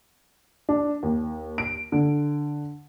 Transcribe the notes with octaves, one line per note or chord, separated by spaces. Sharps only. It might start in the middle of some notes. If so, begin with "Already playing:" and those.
D4
D#2
D7
D3